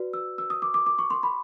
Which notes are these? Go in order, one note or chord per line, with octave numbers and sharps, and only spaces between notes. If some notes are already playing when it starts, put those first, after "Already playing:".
Already playing: F#4 B4 D5
E6
E6
D#6
D6
D6
D6
C#6
C6
B5